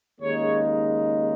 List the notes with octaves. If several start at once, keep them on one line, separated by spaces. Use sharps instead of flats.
D#2 C#3 G#3 D#4 C#5